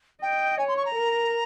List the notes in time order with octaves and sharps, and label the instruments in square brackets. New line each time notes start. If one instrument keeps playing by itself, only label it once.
[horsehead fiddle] D#5 [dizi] G5
[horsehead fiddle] C#5 [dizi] G#5
[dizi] C6
C#6
A#5
[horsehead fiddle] A#4